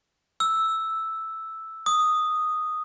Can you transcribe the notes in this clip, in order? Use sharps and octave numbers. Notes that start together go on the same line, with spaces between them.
E6
D#6